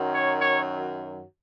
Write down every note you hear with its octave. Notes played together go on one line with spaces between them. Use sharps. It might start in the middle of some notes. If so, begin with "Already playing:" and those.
Already playing: F#2 D#3 F#3
C#5
C#5